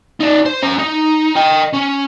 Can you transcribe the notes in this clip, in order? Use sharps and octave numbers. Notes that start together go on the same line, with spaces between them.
D#4 D5
C5
C#4 A#5
D#4
D#5 G5
C#4